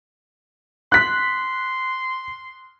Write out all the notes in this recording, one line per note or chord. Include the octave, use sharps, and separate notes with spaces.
C6 F#6 B6